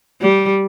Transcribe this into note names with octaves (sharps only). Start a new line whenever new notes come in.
G3